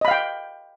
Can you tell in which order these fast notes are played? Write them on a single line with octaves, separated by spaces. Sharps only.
D#5 B5 F5 G5